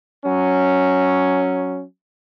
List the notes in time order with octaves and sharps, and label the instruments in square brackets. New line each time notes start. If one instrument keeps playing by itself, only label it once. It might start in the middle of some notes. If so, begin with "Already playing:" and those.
[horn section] F#3 C#4